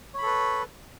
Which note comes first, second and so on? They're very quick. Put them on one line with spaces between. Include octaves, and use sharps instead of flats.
C#5 B5 A4 B4